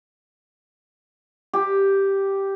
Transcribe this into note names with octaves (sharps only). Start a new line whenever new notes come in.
G4